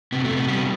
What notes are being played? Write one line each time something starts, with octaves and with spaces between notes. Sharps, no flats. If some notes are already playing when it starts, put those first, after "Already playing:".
C3 B3
A3
C3
B3
G3 B3